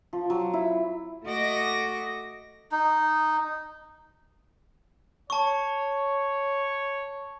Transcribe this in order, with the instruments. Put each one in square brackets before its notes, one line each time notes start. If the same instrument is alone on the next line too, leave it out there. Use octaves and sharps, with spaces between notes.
[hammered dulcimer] F3
F#3
E4
[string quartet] A3 F#4 D#5 D6 A#6
[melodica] D#4
[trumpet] C#5 [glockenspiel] A5 C#6